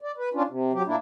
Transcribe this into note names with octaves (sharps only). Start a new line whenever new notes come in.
D5
B4
C#4 D4 F4
C3
F#3 G4
A#2 A#3 D4 E4